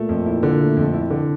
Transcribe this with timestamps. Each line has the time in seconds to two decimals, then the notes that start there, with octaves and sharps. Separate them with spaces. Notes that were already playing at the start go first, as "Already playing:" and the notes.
Already playing: A#2 A3
0.09 F2
0.26 E4
0.43 D3
0.60 A3
0.77 F2
0.94 E4
1.10 D3